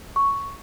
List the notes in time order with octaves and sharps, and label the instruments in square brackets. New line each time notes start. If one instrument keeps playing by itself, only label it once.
[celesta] C#6